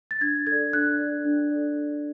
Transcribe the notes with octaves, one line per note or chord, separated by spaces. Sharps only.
A6
D4 G#6
A4 D5 G#6
D4 F#6
A4 D5
D4
A4 D5